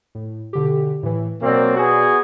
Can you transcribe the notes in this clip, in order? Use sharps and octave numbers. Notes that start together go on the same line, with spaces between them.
A2
B2 D3 G4
A2 E3
B2 F#3 A#3 C4 D5
B3 F#4 G#4